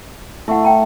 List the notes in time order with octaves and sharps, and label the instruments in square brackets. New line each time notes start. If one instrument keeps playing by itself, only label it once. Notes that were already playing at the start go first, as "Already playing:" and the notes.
[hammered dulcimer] A3 [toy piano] E4 F#5
[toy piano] G5 A#5